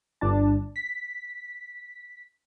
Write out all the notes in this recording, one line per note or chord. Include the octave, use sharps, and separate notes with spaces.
G1 D4 A5
B6